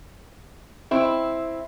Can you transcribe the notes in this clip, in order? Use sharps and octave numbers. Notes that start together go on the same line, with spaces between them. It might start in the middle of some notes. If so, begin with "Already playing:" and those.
C4 E4